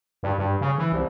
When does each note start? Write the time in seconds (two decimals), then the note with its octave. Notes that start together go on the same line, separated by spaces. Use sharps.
0.23 G2
0.38 G2
0.61 C#3
0.78 E3
0.92 C2